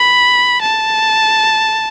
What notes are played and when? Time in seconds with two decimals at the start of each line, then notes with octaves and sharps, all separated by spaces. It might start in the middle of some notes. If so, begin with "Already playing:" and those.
Already playing: B5
0.62 A5